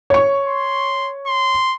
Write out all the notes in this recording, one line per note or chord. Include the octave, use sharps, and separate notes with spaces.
C#5 C#6
C6
C6